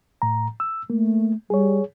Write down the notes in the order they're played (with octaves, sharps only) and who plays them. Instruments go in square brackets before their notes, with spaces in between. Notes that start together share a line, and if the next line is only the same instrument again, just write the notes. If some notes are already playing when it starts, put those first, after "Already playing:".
[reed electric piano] A2 A#5
E6
[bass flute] A3 [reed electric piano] A#3
[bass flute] G3 [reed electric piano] G#4 C#5